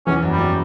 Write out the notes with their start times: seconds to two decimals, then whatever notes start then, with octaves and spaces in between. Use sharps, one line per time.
0.06 E2 E3 C#4
0.22 F#2 F#3
0.31 G3
0.38 F#2 F#3